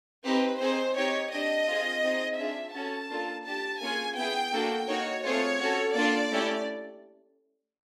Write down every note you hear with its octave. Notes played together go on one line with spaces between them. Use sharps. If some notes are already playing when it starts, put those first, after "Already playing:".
C4 D#4 G4 B4
C4 D#4 G#4 C5
C4 D#4 G4 C#5
D4 G4 D#5
C4 F4 G#4
C4 D#4 G#4
D4 F4 G#4 E5
C#4 F#4 A4 A5
A#3 D4 F4 A4
D4 G4 A5
A#3 C#4 F4 G#4 G#5
B3 E4 G#4 G5
A#3 D4 F#4 A4
A#3 D#4 F#4 C#5
A3 C4 F4 G#4 C#5
C#4 F#4 A4
A#3 D4 F4 A4 D5
A3 C#4 E4 G4